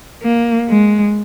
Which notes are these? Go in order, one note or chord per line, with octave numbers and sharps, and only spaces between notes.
A#3
G#3